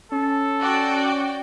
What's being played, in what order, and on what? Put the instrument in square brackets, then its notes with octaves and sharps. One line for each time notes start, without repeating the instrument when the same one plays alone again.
[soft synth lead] C#4 [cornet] A4
[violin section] F#4 D5 G5